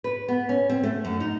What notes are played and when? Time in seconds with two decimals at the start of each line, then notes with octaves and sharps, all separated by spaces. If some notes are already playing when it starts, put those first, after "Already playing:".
0.04 B4
0.28 B3
0.49 C#4
0.70 C4
0.83 A3
1.05 F#2
1.20 D#4